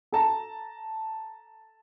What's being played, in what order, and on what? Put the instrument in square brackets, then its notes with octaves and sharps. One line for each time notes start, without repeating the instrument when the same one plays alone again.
[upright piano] A4 A5 A#5